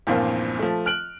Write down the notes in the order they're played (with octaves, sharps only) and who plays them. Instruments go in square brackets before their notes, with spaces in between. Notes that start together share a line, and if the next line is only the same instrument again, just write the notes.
[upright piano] E2 G2 A#2 F3 A#3 C4
F3 A3
F6 F#6 D7 F#7